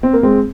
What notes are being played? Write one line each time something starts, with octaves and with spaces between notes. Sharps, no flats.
C4
A#3
G#3 C4